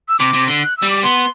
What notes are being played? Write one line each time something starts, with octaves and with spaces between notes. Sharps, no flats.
E6
C3 D6
C3
D3
F#6
G3 E6
D6
B3 C6